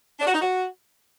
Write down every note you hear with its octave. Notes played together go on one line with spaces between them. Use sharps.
D4
F#4
D#4
F#4